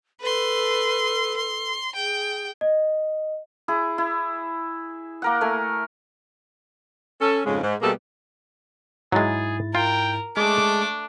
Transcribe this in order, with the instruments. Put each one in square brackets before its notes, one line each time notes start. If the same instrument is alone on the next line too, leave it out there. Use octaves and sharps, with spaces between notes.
[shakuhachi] A4 [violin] B4 C6
[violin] C6
[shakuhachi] G#4 [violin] G5
[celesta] D#5
[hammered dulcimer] E4 G#4
E4
A#3 A#4 F#5
A3 A#4 G#5
[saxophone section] C#4 A4
F2 G#2 C#3 G#3 C#4
G#2
B2 G3 A3 A#3 G#4 A4
[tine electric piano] G#2 E4 A6 [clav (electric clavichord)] F#3 G#3 [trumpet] G#4
[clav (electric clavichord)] F4 [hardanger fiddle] A#4 [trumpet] G5
[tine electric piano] G#3 G#4 [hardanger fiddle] A3 D6 [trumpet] D4